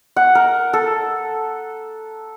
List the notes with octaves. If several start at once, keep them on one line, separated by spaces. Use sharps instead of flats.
F#5
A#4
A4